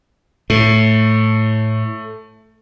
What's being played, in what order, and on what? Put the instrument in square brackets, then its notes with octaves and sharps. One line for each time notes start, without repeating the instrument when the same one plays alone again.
[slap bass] A2 [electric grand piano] A3